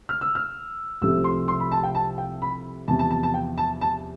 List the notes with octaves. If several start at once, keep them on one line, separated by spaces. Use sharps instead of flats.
F6
E6
F6
C2 C3 F3 A3 C4 E6
C6
C6
B5
A5
G5
A5
G5
B5
E2 C3 F3 A5
A5
A5
A5
G5
A5
A5